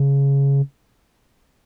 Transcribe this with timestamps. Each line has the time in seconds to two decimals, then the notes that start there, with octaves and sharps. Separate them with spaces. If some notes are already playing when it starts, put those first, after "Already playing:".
Already playing: C#3